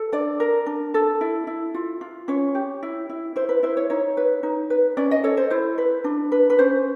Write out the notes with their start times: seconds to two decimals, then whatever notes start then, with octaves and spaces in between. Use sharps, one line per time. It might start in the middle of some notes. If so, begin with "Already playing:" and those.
Already playing: A4
0.12 D4 D5
0.40 A#4
0.66 D4
0.94 A4
1.21 E4
1.47 E4
1.74 F4
2.01 F4
2.28 C#4 C#5
2.55 G4
2.83 E4
3.10 E4
3.36 E4 C5
3.49 B4
3.63 E4 C5
3.77 C#5
3.90 D#4 C#5
4.17 B4
4.43 D#4
4.70 B4
4.97 C#4 D5
5.11 D#5
5.24 A4 C#5
5.37 C5
5.50 E4 C5
5.78 B4
6.04 D4
6.32 B4
6.50 B4
6.59 C#4 C5